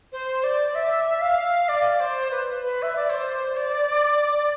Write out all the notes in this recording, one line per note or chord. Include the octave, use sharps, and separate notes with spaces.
C5
D5
E5
F5
D5
C5
B4
B4
E5
D5
C5
D5